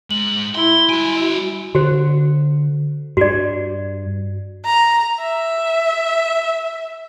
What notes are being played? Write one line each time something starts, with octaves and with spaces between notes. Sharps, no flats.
G#2 G#3 F#7
E4 C6
G3 F#4 G#5 D7
D3 F#4 C5
G2 F#4 D5
A#5
E5